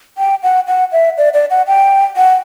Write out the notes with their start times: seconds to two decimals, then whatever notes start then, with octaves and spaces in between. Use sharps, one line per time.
0.18 G5
0.43 F#5
0.67 F#5
0.92 E5
1.18 D5
1.34 D5
1.50 F#5
1.67 G5
2.17 F#5